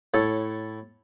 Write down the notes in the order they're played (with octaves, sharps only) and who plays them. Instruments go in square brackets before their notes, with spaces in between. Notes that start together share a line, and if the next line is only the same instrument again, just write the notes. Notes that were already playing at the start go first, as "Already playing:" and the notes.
[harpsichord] A2 A4 C#5